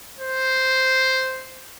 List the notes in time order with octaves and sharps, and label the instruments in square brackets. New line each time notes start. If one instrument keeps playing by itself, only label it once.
[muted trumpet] C5